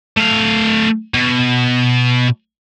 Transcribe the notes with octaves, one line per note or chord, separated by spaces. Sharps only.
A3 F5
B2